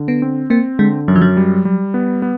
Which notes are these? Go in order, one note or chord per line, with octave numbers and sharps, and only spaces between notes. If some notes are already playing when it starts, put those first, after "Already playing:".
Already playing: D3
B3
C4
A#3 C4
D3 G#3
F#2 F#3
F3
F#3
G3
G3
B3
B3